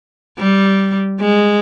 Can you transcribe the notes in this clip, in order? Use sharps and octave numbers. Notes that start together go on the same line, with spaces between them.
G3
G#3